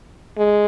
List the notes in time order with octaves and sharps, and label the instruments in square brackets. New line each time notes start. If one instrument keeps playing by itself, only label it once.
[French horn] G#3